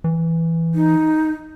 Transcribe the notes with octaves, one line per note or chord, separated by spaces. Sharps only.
E3
D#4